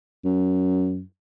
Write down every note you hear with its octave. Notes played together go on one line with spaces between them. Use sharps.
F#2